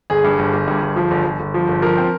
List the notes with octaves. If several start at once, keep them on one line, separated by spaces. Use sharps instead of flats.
G1 G#4
G2
G1
G1
G2
G1
F3
G1
G1
G1
F3
G1
F3 A#4
C4